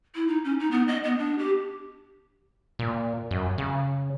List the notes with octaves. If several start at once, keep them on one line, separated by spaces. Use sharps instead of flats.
E4
D#4
C#4
D#4
B3
D#5
B3
D4
G4
A#2
F#2
C#3